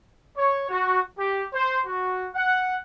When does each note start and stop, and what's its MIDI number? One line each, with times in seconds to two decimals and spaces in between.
0.36 0.68 73
0.69 1.00 66
1.19 1.42 67
1.53 1.79 72
1.86 2.27 66
2.34 2.76 78